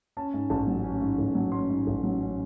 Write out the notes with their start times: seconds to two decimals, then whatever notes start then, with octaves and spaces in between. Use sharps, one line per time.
0.17 C#4 A5
0.34 G#2
0.50 A1 A5
0.67 F#3
0.84 C#4
1.01 G#2
1.18 A1
1.35 F#3
1.52 C#4 C6
1.70 G#2
1.87 A1
2.04 F#3
2.20 C#4